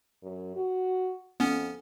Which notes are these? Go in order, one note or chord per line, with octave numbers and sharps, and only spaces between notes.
F#2
F#4
F2 B3 C#4